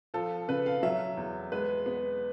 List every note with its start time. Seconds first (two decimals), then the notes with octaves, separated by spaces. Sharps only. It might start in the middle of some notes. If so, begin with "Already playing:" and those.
0.14 F3 A4
0.48 C#3 B4
0.66 F5
0.83 F#3 E5
1.17 E2
1.52 G#3 B4
1.86 B3